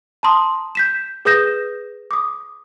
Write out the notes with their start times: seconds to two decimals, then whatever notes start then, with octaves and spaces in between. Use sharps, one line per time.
0.23 A5 A#5 C6 D#6
0.75 G6 B6 E7
1.25 G#4 B4 D#6 G6 A#6 E7
2.11 D6 D#6